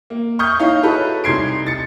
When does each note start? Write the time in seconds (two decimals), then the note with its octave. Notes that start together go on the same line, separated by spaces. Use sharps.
0.10 A#3
0.39 C#6 D#6 F6 G6
0.59 D#4 E4 C#5 D#5 F5
0.83 E4 F#4 G#4 A4 B4 C#5
1.24 C2 D#4 C6 G#6 C7 D7
1.67 A6 C#7